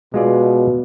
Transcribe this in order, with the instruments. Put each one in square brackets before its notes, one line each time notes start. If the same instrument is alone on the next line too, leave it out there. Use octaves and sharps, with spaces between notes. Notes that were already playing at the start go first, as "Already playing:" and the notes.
[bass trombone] B2 [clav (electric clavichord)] G#3 F4 D5